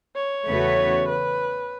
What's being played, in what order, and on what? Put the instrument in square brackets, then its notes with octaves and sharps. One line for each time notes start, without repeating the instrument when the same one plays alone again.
[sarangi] C#5
[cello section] E2 C#3 A3 F#4 B4
[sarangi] B4